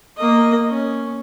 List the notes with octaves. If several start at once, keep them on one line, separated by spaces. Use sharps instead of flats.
A#3 D#5
C#4